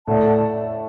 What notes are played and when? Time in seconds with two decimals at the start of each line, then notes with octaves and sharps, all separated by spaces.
0.07 A2 A3 A4 D5 F#5 A5